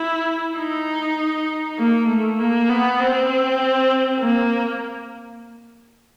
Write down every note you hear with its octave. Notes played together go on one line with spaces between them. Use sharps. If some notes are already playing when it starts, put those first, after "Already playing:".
Already playing: E4
D#4
A#3
A3
A#3
B3
C4
A#3